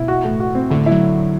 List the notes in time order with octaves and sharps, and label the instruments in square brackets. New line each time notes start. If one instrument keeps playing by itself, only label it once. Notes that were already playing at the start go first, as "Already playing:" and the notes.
Already playing: [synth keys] B2 [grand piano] E4
[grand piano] F#4
A2
F#4
C4
[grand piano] A2 [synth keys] D3
[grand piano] E4
[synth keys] F#3